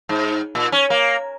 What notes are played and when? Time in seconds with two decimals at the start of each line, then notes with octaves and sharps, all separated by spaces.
0.09 G#2
0.55 A#2
0.72 C#4
0.90 A#3